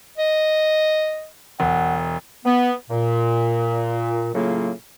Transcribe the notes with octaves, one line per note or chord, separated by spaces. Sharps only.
D#5
E1 F#5
B3
A#2
A2 C#3 F#3 A#3 F4